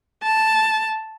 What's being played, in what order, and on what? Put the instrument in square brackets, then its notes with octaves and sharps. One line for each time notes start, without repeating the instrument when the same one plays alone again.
[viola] A5